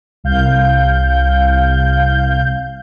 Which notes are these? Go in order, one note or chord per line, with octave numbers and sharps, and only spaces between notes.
C2 F5 G6